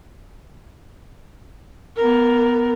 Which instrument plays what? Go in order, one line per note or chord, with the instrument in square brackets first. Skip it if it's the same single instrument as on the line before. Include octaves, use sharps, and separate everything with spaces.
[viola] B3 A#4